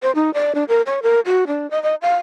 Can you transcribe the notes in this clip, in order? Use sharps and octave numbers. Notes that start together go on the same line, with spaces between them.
C5
D#4
D5
D4
A#4
C#5
A#4
F#4
D4
D#5
D#5
F5